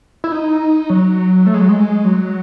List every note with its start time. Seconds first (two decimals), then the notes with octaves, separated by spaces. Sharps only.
0.24 E4
0.32 D#4
0.90 F#3
1.46 A3
1.54 G#3
1.61 F#3
1.69 G#3
2.05 F#3